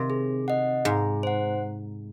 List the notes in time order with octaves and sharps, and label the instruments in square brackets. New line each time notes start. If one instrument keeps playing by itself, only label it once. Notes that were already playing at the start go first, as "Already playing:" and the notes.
Already playing: [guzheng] C3 D#3
[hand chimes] G#4
D#5 F#5
[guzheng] G#2 [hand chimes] G#4
[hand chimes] C5 F#5